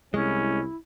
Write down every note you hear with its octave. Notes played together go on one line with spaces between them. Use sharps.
C2 G#3 C#4 E4